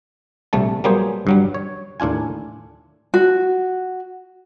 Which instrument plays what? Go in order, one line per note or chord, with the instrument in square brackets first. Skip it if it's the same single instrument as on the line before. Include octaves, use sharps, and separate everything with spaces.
[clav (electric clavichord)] A#1 C3 G3 A3 A5
F#3 G3 A#3 B3 G#4 C5
G2 F#3 G3
C#5
D#2 A2 D4 F4 G#5
[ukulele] F#4